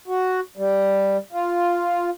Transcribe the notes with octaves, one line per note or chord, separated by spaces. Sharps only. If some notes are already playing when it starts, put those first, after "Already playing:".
F#4
G3
F4